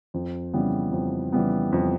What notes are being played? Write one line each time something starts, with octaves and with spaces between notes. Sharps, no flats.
F2
C#3 E3 G3 B3
F2
C#3 E3 G3 B3
F2